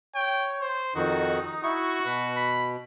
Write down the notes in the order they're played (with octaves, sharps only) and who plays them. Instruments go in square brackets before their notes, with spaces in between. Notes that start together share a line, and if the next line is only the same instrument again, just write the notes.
[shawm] C#5 [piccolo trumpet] G5
[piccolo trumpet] C5
[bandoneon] F2 D#3 [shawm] D#4 [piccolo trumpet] F#4
[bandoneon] E4 C#6 [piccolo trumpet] F#4
[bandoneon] B2 [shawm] B4
[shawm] B5